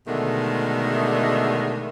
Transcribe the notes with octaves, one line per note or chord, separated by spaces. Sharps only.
B2 D3 D#3 G#3 A3